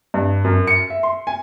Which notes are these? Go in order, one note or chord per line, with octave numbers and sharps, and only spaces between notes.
G2
F#2
C#7
E5
C6
G#5